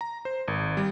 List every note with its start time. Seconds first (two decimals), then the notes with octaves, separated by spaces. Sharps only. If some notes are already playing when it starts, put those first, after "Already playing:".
0.01 A#5
0.25 C5
0.48 G#1
0.77 G3